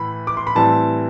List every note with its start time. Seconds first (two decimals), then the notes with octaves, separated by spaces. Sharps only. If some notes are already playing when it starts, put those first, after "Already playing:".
Already playing: A2 E3 B5
0.27 D6
0.37 C6
0.47 B5
0.55 A2 E3 G3 C4 A5